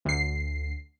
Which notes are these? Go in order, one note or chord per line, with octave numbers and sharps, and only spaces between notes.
D2 C7